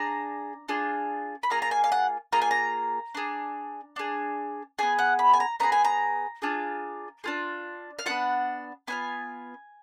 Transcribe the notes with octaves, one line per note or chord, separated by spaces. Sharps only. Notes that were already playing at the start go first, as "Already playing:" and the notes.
Already playing: D4 G#4 A#5
D4 F4 G#4
B5
A#3 F4 G#4 A#5
A#5
G#5
F5
F#5
A#3 F4 G#4 A#5
G#5
A#5
D4 G#4
D4 G#4
B3 D4 G#4 G#5
F#5
B5
G#5
A#5
B3 D4 G#4 A#5
G#5
A#5
D4 F4 G#4
D4 F4 G#4
F5
B3 D4 F4 F#5
B3 D4 F4 G#5